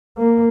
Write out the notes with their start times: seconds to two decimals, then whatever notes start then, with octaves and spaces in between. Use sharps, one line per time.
0.18 A#3